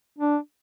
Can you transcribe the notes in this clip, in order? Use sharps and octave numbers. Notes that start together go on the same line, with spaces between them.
D4